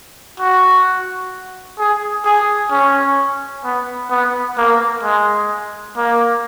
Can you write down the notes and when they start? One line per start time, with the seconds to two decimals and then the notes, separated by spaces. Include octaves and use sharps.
0.40 F#4
1.79 G#4
2.25 G#4
2.71 C#4
3.65 B3
4.11 B3
4.58 A#3
5.03 G#3
5.97 A#3